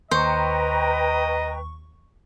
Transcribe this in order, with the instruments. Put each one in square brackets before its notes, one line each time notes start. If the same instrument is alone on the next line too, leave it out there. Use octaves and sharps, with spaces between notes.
[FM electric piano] D#2 C#6 [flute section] B4 G5 A#5 [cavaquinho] C5 [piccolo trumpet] D#5